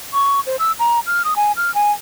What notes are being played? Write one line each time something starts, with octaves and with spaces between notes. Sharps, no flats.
C#6
C5
E6
A#5
F6
D#6
G#5
F6
G#5